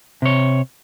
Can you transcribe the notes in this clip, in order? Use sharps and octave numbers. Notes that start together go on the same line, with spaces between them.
C3 C#5